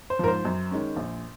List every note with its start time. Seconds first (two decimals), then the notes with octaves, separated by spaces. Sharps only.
0.10 C5
0.19 G#2 F3 A#4
0.28 C5
0.45 F#2
0.71 D#3 G#3 C#4
0.96 A#1